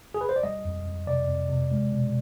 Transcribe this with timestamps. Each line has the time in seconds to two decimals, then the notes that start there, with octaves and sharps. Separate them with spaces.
0.14 G#4
0.21 B4
0.29 C5
0.36 D5
0.43 G3 D#5
0.65 F2
0.86 F2
1.07 C3 D5
1.29 F2
1.49 C3
1.72 G#3
1.93 B2